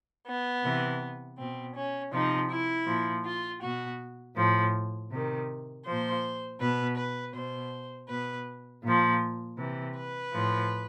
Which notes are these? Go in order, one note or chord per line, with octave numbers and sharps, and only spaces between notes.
B3
C3 E3
B2 C4
C#4
C3 F3 D#4
E4
A#2 F3
F4
B2 F#4
A2 F3
C3 D#3
A#2 F3 C5
B2 B4
B4
B2 C5
B2 B4
A#2 F3
C3 E3
B4
A2 F3